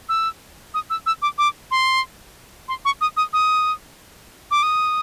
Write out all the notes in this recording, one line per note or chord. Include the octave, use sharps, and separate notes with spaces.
E6
D#6
E6
E6
D6
D6
C6
C6
C#6
D#6
D#6
D#6
D6
D#6